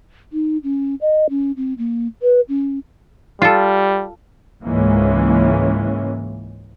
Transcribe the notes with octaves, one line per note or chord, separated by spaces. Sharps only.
D#4
C#4
D#5
C#4
C4
A#3
B4
C#4
G3 F4 A4
C#2 G#2 E3 G#3 A#3 C#4